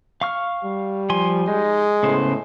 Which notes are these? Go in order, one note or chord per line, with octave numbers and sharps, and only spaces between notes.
F5 C#6 F6
G3
F3 G#5 C6
G#3 D#4
A2 C#3 B3 C5